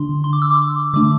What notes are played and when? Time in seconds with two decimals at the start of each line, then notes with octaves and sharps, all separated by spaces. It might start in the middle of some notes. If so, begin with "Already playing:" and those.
Already playing: D3 D4 C6
0.24 C6
0.33 D6
0.42 E6
0.51 D6
0.93 D3 A3 D4 D6